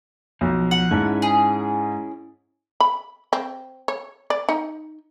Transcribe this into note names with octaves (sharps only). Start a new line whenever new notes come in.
B1 F3
F#5
G#2 C#4 E4 A5
G#4
B5
C4
C#5
D5
D#4